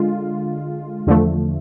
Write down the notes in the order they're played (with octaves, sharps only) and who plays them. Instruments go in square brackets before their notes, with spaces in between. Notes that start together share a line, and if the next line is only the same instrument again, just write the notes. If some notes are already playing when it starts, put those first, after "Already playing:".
Already playing: [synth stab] D3 G#3 F4
E2 D3 F3 A3